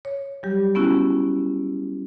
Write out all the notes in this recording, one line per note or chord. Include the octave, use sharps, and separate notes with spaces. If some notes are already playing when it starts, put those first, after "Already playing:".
C#5
F#3 G3 G4
B3 C#4 E4 F#4